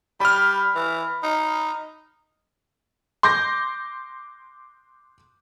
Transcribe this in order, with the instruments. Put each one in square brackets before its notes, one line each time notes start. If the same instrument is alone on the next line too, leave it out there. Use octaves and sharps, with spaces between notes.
[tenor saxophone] G3 [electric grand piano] B5 F6
[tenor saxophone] E3
D#4
[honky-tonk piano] C6 D6 G6 A#6